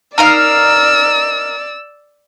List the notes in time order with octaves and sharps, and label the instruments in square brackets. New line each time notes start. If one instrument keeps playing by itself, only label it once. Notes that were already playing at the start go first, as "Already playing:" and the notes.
[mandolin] D#4 A#4 F5 [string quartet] D5 E6